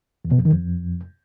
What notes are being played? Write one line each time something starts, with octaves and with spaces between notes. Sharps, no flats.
E2
B2
F2
D#3
F2